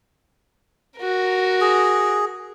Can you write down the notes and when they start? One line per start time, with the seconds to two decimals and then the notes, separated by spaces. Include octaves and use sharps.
0.97 F#4 A#4
1.61 G#4